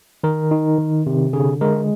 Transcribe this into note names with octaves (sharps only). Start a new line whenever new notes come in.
D#3 A#4
D#4
D#3
C3
D3 G#4
G#3 A#4